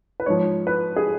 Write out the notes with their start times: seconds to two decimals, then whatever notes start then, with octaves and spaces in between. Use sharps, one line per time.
0.20 B4
0.26 G#2 F3 C#5
0.67 B4
0.96 G#4